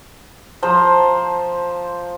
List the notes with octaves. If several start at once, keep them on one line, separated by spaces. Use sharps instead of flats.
F3 C5 A#5